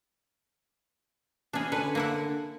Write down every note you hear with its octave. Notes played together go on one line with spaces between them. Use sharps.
E3 C#4 D4 G#4
D3 B4 C#5 G#5
A#3 E4 F#5